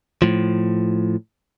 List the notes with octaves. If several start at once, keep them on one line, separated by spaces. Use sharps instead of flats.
A2 F3